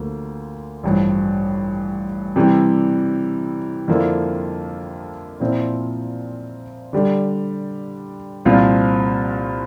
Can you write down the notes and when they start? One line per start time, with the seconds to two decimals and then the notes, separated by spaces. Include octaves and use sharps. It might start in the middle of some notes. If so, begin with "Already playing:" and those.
Already playing: D2 D3 F3 A#3
0.83 A1 G2 F3
2.36 C3 E3 G3
3.88 F2 D3 F3 A#3 E4
5.40 A#2 F3 C4 E4
6.93 D3 G3 D4
8.45 C2 A#2 F3 C4 F4